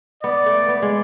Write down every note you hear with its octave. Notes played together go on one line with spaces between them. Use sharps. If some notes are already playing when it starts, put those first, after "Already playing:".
B3 D5
A3
B3
G#3